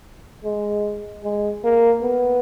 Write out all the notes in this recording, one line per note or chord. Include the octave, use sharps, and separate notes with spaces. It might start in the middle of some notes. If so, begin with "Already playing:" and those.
G#3
G#3
A#3
B3